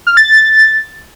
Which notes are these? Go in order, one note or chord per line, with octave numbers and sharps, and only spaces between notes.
F6
A6
A6